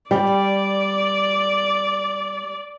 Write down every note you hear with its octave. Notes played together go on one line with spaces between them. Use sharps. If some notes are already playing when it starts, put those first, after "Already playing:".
G3 D5